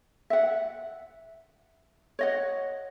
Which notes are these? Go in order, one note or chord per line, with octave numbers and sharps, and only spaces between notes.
E5 F#5
C#5 D#5 F#5